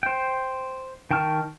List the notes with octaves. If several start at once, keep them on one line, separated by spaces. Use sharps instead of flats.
C5 G5
D#3 G5 A5 C#6 F6